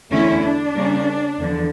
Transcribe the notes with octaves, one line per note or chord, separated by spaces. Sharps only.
E2 D3 A3 C#4 E4
D4
C#3 G3 A#3 C#4
E2 D3 F3